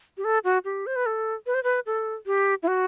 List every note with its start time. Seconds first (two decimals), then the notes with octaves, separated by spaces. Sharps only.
0.18 G4
0.24 A4
0.44 F#4
0.65 G4
0.87 C5
0.96 B4
1.06 A4
1.46 B4
1.54 C5
1.64 B4
1.86 A4
2.26 G4
2.63 E4
2.68 F#4